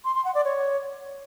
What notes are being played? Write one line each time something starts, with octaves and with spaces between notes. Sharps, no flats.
C6
C6
F#5
D5
C#5